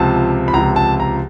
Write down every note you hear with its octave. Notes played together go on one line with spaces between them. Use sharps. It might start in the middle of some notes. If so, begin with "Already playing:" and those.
Already playing: C#2 C3 F3 A5
B5
C#2 C3 F3 A#5
A5
A#5